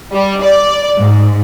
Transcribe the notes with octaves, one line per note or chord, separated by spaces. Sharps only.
G3
D5
G#2